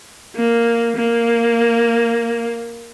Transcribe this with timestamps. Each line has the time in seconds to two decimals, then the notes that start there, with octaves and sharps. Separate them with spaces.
0.36 A#3
0.96 A#3